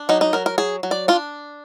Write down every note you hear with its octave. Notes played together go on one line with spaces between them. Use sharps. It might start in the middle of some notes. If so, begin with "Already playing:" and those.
Already playing: D4
F#3 D#4
D#4
F#3 A#4
A#4
F#3 G#4
F#3
D5
D4 F4